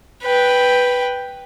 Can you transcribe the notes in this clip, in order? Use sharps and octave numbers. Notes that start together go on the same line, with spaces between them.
B4 G5